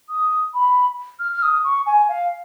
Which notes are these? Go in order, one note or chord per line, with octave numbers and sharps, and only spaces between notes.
D#6
B5
F6
F6
D#6
C#6
G#5
F5